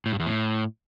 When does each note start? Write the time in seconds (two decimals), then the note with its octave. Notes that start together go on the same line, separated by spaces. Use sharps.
0.06 A2
0.13 G2
0.20 E2
0.26 A2